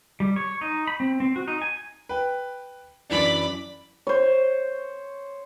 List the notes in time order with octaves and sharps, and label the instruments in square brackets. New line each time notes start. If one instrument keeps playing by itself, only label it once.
[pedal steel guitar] G3
C#5
D#4
B5
C4
C4
F#4
D#4
G#5
[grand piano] B4 G5
[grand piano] F#2 E3 D4 [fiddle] D5 B5
[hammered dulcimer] C5 C#5